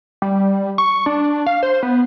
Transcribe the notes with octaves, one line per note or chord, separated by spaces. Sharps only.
G3
C#6
D4
F5
C5
B3